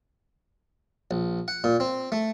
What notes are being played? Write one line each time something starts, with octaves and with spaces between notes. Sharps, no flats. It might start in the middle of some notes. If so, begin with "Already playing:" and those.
A#1
F#5
A#2
C4
A3